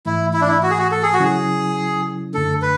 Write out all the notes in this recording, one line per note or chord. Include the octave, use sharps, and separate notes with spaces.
G#2 E3 A3 E4
E4
D4
E4
F#4
G#4
F#4
A4
G#4
F#4
C#3 F#3 C#4 E4 G#4
F#2 D3 A3 D4 A4
B4